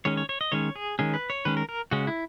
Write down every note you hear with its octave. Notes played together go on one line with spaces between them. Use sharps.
D#3 G#3 C#4 C#5
C#5
C#5
D#5
D#3 G#3 C#4 C#5
G#4
D#3 G#3 C#4 G#4
B4
C#5
D#3 G#3 C#4 B4
A#4
A#4
C#3 G#3 C#4 F#4
E4